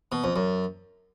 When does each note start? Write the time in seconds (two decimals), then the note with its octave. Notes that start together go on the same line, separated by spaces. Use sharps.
0.12 B2
0.24 F2
0.36 F#2